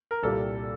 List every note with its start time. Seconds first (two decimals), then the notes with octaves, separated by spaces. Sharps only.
0.11 A#4
0.23 C2 A#2 G3 A4